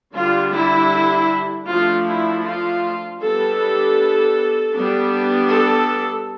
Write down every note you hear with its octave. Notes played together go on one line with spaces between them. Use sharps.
D3 G3 D4 F4
E4
F3 A3 D4 F4
E4
F4
G3 B3 D4 A4
G3 B3 D4
A4